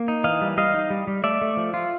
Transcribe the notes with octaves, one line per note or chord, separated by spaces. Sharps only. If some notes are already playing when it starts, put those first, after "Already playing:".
Already playing: A#3
D#4
E3 D#5 F5
G3
G3 D#5 F5
D#4
G3
G3
A3 D5 E5
A3
F3
F4